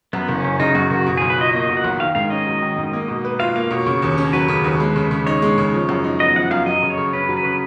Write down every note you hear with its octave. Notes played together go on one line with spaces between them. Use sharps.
F#2 B3
F#1
C#4
F#1
C#3 D#4
F#2 F#4
F#1 F#4
B2
B1 G#4
B4
F4 D#5
A#3 D#5
B2
F#5
B1
D#3 F5
G#2 F5
C#4 D#5
F#3
D#3
G#2
A#3
B2
B4
F4 F5
A#3 F5
B2 C#5
C#3
D#2
C#4
F#3 B4
C#3
D#2
G#3
C#3
C#3
D#4 C#5
G#3
C#3
F3
F#2
D#4
B3 D#5
F3 F#5
F#2 F5
F#3 D#5
C#3
C#5
C#3
C#4 B4
F#3
B4
C#3